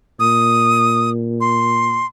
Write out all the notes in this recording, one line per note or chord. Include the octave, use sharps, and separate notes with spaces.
A#2 D#6
C6